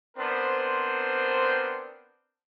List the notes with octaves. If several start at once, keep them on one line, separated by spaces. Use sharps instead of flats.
B3 C4 D4 A#4 C5